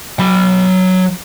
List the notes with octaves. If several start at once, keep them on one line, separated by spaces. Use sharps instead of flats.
F#3 B5